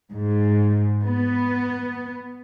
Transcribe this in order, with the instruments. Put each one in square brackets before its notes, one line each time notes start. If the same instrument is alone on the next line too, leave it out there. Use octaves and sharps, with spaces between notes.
[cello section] G#2
B3